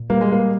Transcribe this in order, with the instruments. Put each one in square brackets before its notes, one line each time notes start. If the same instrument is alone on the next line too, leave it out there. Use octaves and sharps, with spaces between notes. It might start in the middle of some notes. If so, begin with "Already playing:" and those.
Already playing: [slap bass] A#2
[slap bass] G3 [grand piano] A#3
[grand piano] G#3
A#3